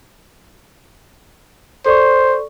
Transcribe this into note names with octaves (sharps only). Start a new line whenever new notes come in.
A4 C5 D5 C#6